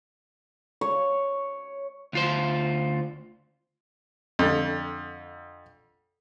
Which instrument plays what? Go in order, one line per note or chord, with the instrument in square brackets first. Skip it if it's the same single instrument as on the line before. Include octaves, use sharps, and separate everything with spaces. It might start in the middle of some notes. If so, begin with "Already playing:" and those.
[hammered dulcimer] C#5
[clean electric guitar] D2 F4 C5
[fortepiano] F2 D3